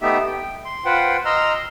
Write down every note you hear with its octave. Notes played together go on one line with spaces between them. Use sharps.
A3 B3 D#4 G4 E5
G5
C6
F4 B4 C5 F#5 G5
D#5 A#5 C6 E6 F6